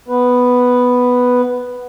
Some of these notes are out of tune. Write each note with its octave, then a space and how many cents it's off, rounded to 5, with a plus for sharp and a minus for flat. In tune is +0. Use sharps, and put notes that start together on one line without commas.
B3 +0 B4 +0